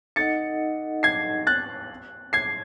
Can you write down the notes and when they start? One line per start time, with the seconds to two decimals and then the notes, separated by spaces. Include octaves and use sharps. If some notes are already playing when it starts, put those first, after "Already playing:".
0.16 D#4 A4 D#5 F#5 A6 C#7
1.03 G#6 C7
1.47 F#6 A6
2.33 G#6 C7